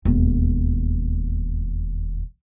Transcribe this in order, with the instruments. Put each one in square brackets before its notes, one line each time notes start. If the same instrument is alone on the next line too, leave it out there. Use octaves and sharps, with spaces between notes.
[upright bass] E1 D#2